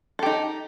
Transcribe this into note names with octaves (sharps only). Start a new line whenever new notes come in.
D#4 G4 A4